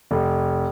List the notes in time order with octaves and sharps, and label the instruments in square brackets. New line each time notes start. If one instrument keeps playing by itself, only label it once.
[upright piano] F1